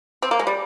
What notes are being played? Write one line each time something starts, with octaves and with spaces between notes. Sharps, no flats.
C4
A#3
G#3
G3